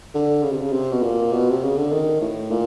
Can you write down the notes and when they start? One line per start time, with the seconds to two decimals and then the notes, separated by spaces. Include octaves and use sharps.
0.15 D3
0.43 C#3
0.52 C3
0.62 C#3
0.73 C3
0.92 B2
1.03 A#2
1.33 B2
1.50 C3
1.64 C#3
1.77 D3
1.92 D#3
2.21 A2
2.51 A#2